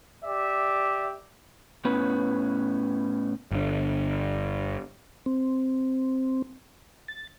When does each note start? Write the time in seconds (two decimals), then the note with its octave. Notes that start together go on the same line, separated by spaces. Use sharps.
0.24 G4 D5 E5
1.85 A2 B3 C#4 B4
3.52 G1 D3
5.26 C4
7.08 A6